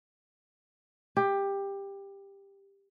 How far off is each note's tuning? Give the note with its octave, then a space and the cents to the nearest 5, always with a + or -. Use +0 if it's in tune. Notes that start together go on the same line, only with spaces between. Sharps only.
G4 +15